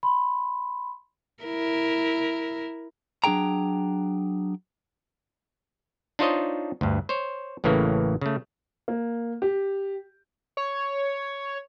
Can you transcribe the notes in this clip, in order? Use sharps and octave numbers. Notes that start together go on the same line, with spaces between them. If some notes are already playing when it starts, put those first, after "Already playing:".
B5 C6
E4 A#4
F#3 D4 G4 G#4 G5 A#5
D4 D#4 F4 C5 C#5 D#5
D2 G2
C5 C#5
A1 A2 C#3 E3 A#3
C#3 A3
A#3
G4
C#5